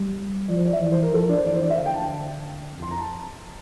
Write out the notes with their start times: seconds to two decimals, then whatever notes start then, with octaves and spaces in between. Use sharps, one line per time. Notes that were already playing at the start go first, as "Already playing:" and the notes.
Already playing: G3
0.48 F3 D5
0.57 C5
0.65 D5
0.73 E5
0.81 E3 D5
0.92 C5
1.03 A#4
1.13 F3 A4
1.21 A#4
1.29 D4
1.37 C5
1.46 E3 D5
1.54 C5
1.62 D5
1.70 E5
1.78 D3 F5
1.86 G5
1.94 A5
2.02 G5
2.74 F2
2.82 C6
2.91 A#5
2.98 A5